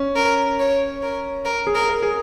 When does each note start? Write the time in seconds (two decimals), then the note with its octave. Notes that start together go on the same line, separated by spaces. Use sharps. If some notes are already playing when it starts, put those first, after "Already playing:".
Already playing: C#4
0.16 A#4
0.59 C#5
1.02 A#4
1.45 A#4
1.67 G#4
1.75 A#4
1.89 A#4
2.03 G#4